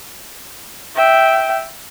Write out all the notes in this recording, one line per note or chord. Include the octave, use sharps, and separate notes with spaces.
E5 G5